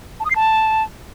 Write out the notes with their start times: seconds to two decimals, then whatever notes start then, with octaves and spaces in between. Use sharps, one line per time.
0.20 A5
0.25 D#6
0.30 C7
0.36 A5